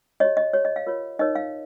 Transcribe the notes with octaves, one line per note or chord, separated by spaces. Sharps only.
G4 C#5 D#5
D#5
G4 C#5
D#5
F5
F4 A#4 C#5
D#4 A#4 C#5 D#5
F5